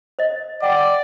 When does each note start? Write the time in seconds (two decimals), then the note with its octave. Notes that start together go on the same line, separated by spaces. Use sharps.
0.19 C5 D#5
0.62 D5 F#5 G5